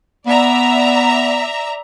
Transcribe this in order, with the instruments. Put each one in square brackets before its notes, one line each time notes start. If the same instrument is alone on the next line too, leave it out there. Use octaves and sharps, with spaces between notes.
[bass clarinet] B3 [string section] D5 E5 A#5